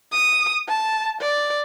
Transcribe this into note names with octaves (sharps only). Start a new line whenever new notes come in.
D#6
A5
D5